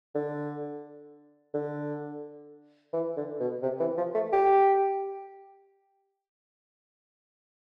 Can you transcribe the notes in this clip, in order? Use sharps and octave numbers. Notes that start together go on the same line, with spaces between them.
D3
D3
E3
D3
B2
C3
E3
F3
A3
G4